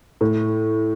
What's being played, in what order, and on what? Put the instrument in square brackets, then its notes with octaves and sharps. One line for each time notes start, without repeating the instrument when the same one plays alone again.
[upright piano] A2